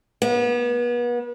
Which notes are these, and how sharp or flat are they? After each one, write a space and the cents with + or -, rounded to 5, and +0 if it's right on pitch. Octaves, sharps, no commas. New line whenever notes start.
B3 -35